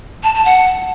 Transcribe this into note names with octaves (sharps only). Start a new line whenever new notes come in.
A5
A5
F#5